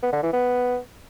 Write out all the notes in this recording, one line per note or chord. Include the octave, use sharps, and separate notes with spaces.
B3
D3
E3
B3